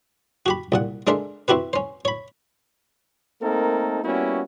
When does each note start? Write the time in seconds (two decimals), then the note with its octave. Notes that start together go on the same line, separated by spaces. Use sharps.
0.46 F#4 G4 B5
0.72 C2 A#2 F#5
1.07 G#3 D4 A4 A#4 C5 E5
1.48 C4 E4 F#4 G4 B4
1.73 C#4 C5
2.05 C#5 B5
3.42 A3 A#3 C4 D#4 A4 A#4
4.04 G3 A#3 B3 C#4 E4 F#4